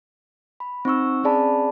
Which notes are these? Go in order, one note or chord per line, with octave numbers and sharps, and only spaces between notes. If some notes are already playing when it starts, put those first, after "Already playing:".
B5
C4 D#4 C#6 E6
C4 C#4 G#4 D5 A5 B5